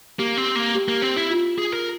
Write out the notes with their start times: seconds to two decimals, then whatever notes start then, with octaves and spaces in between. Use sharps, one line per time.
0.19 A#3 G4
0.37 C4
0.55 A#3
0.75 G4
0.88 A#3
1.02 C4
1.16 E4
1.31 F4
1.58 G#4
1.73 A#4